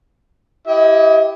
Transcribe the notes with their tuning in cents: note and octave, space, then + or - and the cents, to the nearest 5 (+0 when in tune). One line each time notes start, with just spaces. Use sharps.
E4 +10 G4 +0 D#5 +35